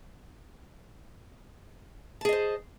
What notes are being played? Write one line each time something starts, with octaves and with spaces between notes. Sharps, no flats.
G#4 C5 D#5 A5